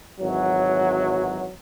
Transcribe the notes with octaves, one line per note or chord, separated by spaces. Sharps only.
G#1 E3 F#3